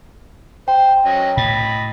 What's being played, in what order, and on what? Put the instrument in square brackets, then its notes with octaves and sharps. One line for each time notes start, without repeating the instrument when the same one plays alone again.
[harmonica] C5 [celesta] G5
[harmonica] F#3 C#4 D#5
[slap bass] A2 [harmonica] D#5 B5